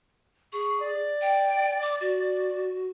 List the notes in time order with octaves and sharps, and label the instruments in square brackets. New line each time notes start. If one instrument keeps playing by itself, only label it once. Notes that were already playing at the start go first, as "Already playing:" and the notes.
[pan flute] G#4 [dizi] C#6
[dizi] D5
[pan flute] G5
D6
F#4